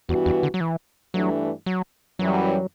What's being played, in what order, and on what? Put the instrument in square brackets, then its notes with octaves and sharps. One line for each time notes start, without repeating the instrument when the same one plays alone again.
[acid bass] E2 [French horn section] G2 E3 B3 F#4
[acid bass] E2
D3
F#3
E3
[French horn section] G2 E3 A3 D4 [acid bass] F#3
[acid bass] F#3
[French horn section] F#2 E3 G3 [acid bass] F#3